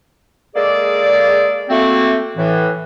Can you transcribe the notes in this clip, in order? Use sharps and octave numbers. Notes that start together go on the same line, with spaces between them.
G#3 A#3 G#4 A4 D5
A3 A#3 C4 F#4
A2 E3